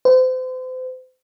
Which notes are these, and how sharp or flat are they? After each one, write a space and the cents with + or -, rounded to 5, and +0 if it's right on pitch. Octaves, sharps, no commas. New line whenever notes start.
C5 -35